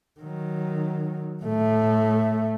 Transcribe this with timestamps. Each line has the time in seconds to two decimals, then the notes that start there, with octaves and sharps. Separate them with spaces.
0.20 D#3 F#3
1.43 A2 A3